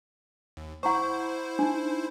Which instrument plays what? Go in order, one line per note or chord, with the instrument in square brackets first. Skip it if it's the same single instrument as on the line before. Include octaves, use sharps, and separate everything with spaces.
[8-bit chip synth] D#2
[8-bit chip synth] E4 C5 [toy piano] F#5 A#5 C#6
[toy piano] D4 D#4